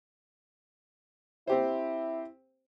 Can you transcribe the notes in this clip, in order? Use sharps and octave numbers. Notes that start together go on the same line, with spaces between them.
C4 E4 G4 C5